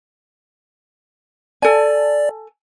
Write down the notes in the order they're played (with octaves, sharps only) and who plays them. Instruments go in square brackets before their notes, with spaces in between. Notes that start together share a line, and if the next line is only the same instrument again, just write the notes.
[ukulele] A4 G#5 [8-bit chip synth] D5